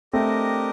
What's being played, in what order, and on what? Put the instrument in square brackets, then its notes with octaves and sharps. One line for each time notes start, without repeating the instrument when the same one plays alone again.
[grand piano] A3 C4 [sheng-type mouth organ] D4 G4 A#4 D#5